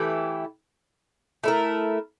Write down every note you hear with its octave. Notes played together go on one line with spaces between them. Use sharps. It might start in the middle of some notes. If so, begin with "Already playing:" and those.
Already playing: E3 A3 E4 G4
A3 E4 A#4